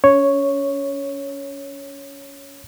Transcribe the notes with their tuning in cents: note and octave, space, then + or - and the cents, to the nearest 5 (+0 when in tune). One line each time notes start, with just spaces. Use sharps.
C#4 +30 C#5 +0